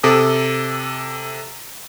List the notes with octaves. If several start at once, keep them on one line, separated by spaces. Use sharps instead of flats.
C3 A4 D6 D#6